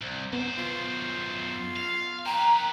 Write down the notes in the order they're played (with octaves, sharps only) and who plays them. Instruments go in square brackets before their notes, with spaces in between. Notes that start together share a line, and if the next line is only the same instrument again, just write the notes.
[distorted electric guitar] C2
[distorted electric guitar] F#2 C5 [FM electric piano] B3
[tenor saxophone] F4
[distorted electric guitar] F5
[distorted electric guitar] A#3 B4 [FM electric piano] G5 [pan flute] A#5